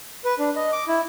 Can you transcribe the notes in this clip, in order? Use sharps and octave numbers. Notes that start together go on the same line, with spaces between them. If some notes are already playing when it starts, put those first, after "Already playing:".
B4
D4
D#5
D6
E4